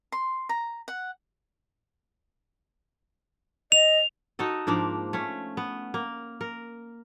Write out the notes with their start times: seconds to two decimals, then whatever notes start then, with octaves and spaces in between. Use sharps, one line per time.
0.12 C6
0.49 A#5
0.88 F#5
3.72 D#5 F7
4.39 D#4 F#4 A4 D#5
4.67 G#2 F3 A#3 D4
5.13 A3 C#4
5.57 B3
5.94 A#3
6.41 A#4